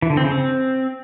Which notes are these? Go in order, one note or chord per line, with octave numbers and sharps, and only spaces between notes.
E3
D3
C4
C#3
C4